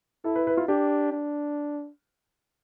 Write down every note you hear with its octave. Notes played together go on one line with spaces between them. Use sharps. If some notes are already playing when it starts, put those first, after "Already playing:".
E4 A4
B4
B4
F4
D4 G4
D4